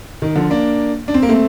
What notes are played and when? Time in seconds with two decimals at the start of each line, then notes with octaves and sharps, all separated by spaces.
0.22 D#3
0.35 D3 F3
0.50 A#3 D4
1.08 D4
1.14 C4
1.23 A#3
1.29 A3 C4